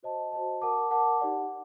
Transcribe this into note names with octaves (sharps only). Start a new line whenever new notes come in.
F#4 C5 D#5 A5
F#4 C5 D#5 A5
A#4 F#5 A5 D6
A#4 F#5 A5 D6
D#4 G4 D5 F#5